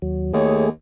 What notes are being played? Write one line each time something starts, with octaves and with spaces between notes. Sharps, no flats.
D#2 F#3
D#2 A3 G#4 C#5